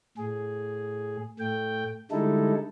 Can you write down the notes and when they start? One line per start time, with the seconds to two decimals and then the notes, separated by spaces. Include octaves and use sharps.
0.18 A2 G#4
1.40 A2 A3 G5
2.11 D3 G3 G#3 D#4 E4 A4